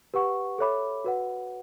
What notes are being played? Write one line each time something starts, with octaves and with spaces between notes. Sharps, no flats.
G4 B4 F#5 C#6
A4 C#5 E5 B5 D6
F#4 B4 F#5